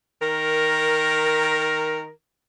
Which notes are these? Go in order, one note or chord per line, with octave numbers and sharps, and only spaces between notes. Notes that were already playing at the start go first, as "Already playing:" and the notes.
D#3 A#4